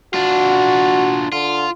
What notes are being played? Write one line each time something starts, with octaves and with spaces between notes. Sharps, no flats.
D4 F4 F#4
D3 F4